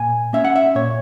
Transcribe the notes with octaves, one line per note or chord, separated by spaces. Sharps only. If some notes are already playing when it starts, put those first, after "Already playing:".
Already playing: A#2 G#5
A#3 C#4 E5
F#5
E5
A#2 C#5